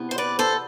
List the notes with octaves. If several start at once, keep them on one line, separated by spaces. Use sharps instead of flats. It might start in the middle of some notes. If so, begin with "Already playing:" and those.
Already playing: E2 C3 E3 B3
C5
B4 D5
A4 C5